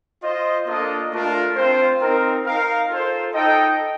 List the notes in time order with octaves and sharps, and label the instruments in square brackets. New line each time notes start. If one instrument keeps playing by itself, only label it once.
[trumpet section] F4 C5 D#5
A#3 D4 F4 A4 D#5
A3 D4 F4 A#4
C4 F4 C5
C4 D#4 A#4
D#4 A#4 F5
F4 A4 C5
D#4 A4 D#5 G5